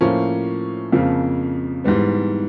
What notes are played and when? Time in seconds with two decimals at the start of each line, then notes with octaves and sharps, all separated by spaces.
0.01 A2 F3 A#3 C#4
0.92 F2 C#3 F3 A#3
1.84 G#2 E3 G3 B3